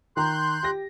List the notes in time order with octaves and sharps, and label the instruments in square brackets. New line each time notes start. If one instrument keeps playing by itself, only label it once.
[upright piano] D#3 A#5 [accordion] C6 F#6 G6
[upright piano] G4 A#6